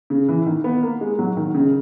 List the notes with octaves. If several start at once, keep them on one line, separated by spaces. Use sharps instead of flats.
C#3
E3
D#3
B3
A#3
G#3
F#3
D#3
C#3